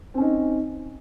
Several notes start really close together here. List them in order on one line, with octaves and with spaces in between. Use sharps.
C4 C#4 D#4